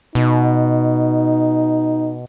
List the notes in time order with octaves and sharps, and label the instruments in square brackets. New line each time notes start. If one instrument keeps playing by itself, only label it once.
[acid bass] B2 [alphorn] D#4